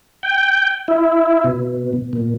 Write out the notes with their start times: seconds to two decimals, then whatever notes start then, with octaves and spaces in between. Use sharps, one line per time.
0.23 G5
0.88 E4
1.44 B2
2.13 A#2